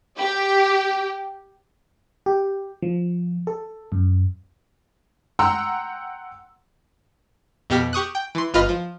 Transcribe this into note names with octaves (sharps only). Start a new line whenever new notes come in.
G4
G4
F3
A4
F#2
F#5 G5 A#5 C6 E6
F2 B2 G4 F6 B6
G4 C#6 D#6 F#6
G5
E3 C6
G1 F4 B4 D#5 F6
F3